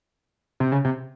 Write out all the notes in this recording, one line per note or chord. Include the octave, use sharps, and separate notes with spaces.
C3
C#3
C3